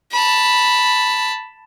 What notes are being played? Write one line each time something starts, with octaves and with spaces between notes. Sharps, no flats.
A5 B5